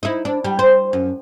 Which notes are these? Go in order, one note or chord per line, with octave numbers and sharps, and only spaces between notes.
D#4 E4
D4
G3
C5
F#2